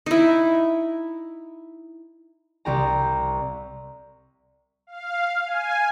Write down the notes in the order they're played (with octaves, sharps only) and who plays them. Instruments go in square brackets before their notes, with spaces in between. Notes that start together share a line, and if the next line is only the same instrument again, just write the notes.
[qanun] D#4 E4
[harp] C2 G4 A#5
[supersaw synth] F5
G#5